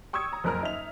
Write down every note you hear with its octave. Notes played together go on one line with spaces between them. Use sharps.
G5 C#6 D#6 E6 G#6 C#7
A#5
F#1 F2 A#4 A#5 F6
D#4 E5 F7